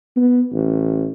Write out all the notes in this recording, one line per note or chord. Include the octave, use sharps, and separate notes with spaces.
B3
A1